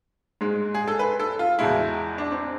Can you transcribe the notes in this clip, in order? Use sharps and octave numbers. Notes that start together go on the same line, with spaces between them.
G#2 G#3
G#4
A4
B4
A4
F4
E2 B2 G#3 E4
D4
C4